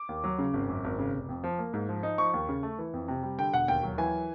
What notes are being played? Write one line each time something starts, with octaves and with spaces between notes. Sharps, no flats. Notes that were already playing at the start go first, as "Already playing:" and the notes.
Already playing: D6
D#2
F#3
C#3
G#1
F#2
G#1
C#3
F1
F2
F3
A#3
G#2
F3
D#4
F3 C#6
D#2
C#3
A3
E3
F2
C3
G3
D3 G5
E1 F#5
D#2 G5
F#3
E3 G#5